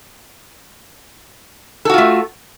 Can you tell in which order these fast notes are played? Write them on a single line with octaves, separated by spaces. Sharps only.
A4 F#4 F4 A3